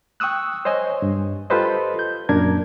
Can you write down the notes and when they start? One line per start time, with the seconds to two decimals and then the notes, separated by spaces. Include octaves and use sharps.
0.20 G5 C#6 D#6 E6 F#6
0.65 C5 C#5 D#5 G#5
1.02 G2
1.50 F4 G4 A4 B4 C5 D#5
1.99 G6
2.29 F#2 A#2 D4 A#4 G#6